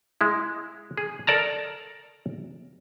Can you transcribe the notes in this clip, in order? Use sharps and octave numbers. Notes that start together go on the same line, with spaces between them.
G#3 E4
G#4
A4 A#4 D5 A5 A#5